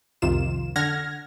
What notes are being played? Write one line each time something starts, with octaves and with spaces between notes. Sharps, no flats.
C2 F2 C3 D#3 F4 E7
D3 F#5 F6 G#6 A#6